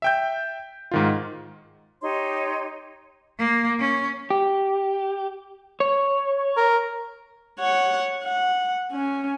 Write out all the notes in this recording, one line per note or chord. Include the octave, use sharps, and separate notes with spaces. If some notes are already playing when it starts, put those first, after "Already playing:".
E5 G5 G6
G#2 D#3 F4
D#4 G4 C#5 C6
A#3
C#4
G4
C#5
A#4
C#5 F#5
F#5
C#4